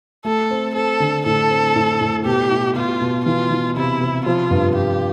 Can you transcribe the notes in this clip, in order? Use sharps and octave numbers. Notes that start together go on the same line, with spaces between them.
A3 A4
C4
C4 A4
D3
A2 A4
C4
A2
A2
B2 G4
E4
B2 F4
B2
E3 F4
E3
C3 E4
C3
F3 F4
G2
F4 G4